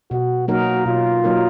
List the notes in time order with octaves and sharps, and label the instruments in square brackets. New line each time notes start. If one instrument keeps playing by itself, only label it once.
[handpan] B2 [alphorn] F#4
[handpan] F#3 A#3 D#4 A#4 [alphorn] F#4
[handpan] B2 [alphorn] F4
[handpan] F#3 A#3 D#4 A#4